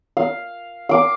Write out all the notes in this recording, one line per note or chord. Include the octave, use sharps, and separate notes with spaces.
F5
F5 D6